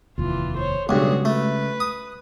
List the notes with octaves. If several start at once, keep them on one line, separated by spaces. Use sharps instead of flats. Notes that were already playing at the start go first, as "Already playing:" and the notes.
F1 D#2 E3 F4
C5 C#5
B1 G2 C#3 G#3 F#4 G#4
A3 B4
D#6